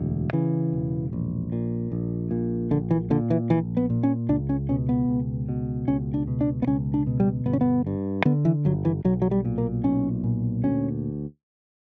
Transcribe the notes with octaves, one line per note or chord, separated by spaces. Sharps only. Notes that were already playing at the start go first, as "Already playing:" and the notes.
Already playing: E1 D2
C#3 E3
E1
A#1
A#2
A#1
A#2
A#1 D3
E3
A#2 D3
E3
A#1 E3
B3
A#2
C#4
C#2 D4
C#4
B2 C#4
B3
C#2
B2
C#2 C#4
D4
B2
D4
B3
C#2 C#4
D4
B2
G3
G1 B3
C#4
B3
G2
D3 B3
E3
G1 F#3
E3
B1 F#3
F#3
G3
A#2
A#3
B1 C#4
A#2
D2 C#4